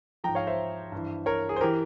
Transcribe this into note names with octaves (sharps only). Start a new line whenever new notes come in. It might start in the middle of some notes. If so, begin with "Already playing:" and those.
G#2 F3 G5 A#5
C#5 F5
C5 E5
G2 E3
A#4 C#5
G#4
C5
E3 G4 A#4